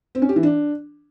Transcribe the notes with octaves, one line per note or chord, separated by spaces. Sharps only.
C4
C#4
G4
E3
D4